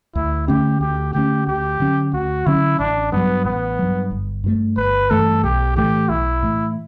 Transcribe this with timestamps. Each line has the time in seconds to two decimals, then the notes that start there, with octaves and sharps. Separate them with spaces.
0.15 D2 E4
0.48 D3 A3 C#4 G4
0.81 D2 G4
1.14 D3 A3 C#4 G4
1.47 D2 G4
1.80 D3 F#3 C#4
2.13 D2 F#4
2.46 D3 F#3 C#4 E4
2.79 A1 D4
3.12 G2 F#3 B3
3.45 A1 B3
3.79 G2 F#3
4.11 G1
4.44 G2 E3 A3
4.77 G1 B4
5.10 G2 E3 A3 A4
5.44 B1 G4
5.76 A2 E3 A3 G4
6.09 B1 E4
6.42 A2 E3 A3